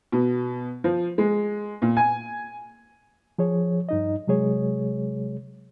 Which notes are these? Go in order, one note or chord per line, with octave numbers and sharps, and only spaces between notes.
B2
F3
G#3
A#2
G#5
F3 G#4 C#5
G2 D#4 D#5
C3 F#3 G#3 G#4 C#5